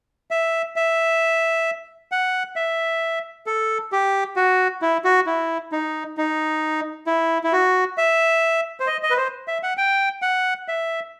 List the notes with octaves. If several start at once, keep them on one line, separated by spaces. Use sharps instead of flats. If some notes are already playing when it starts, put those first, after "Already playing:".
E5
E5
F#5
E5
A4
G4
F#4
E4
F#4
E4
D#4
D#4
E4
E4
F#4
E5
C5
D#5
D#5
B4
C5
E5
F#5
G5
F#5
E5